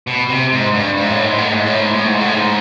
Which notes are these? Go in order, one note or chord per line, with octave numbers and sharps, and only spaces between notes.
B2
C3
G#2
G2
G#2
A2
G#2
A2
G#2
A2
G#2
A2
G#2
A2
G#2